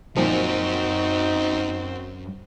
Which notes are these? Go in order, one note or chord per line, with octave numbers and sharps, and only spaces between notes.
F#2 A#2 D#3 F3 F#3 C4 D#4 F#4